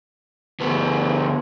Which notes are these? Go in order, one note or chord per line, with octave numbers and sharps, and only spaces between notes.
D2 B3